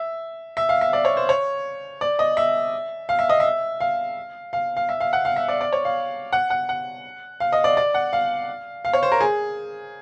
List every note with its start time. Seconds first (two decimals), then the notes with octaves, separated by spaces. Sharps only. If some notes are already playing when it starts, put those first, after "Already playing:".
Already playing: E5
0.57 E5
0.69 F5
0.81 E5
0.93 D5
1.05 C#5
1.17 C5
1.29 C#5
2.01 D5
2.19 D#5
2.37 E5
3.09 F5
3.19 E5
3.29 D#5
3.40 E5
3.80 F5
4.53 F5
4.77 F5
4.89 E5
5.00 F5
5.13 F#5
5.25 F5
5.36 E5
5.48 D5
5.61 D5
5.73 C#5
5.85 F5
6.33 F#5
6.50 F#5
6.69 F#5
7.40 F5
7.52 D#5
7.64 D5
7.77 D5
7.94 F#5
8.13 F5
8.85 F5
8.93 C#5
9.03 C5
9.12 A#4
9.20 G#4